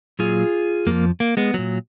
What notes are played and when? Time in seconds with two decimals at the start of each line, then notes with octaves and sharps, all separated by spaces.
0.19 A#2 F#3 F4 G#4
0.86 F2 F3 A#3
1.20 A#3
1.37 G#3 B3
1.54 A#2 F#3